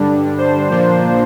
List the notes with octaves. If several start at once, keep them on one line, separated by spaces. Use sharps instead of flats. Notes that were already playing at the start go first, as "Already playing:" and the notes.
Already playing: G2 D3 G3 D4
C5
A#2 F3 A#3 D4